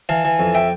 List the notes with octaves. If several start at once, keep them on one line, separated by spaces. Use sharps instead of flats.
E3 F5 A5
E3
F2
E5 G5